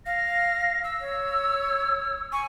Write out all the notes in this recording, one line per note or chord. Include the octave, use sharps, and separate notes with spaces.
F5 A#6
E6
C#5
G#5 C#6